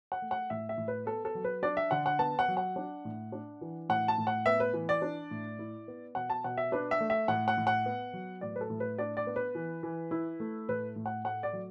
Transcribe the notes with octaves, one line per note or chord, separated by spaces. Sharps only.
F#5
A3
F#5
A2 E5
E5
A2
B4
B3 A4
A4
F#3
B4
D4 D5
E5
D3 F#5
F#5
B3 A5
F#5
F#3
F#5
D4
A2
D4
E3
A2 F#5
A5
A2
F#5
B3 E5
B4
E3
D5
D4
A2
E4
B3
B2 F#5
A5
B2 F#5
E5
D4 B4
E5
A3
E5
A2 F#5
F#5
A2
F#5
B3
F#3
A2 D5
B4
A4
A2
B4
D4 D5
D5
B3
B4
E3
E3
E4
A3
A2 B4
A2
F#5
A3 F#5
D5
F#3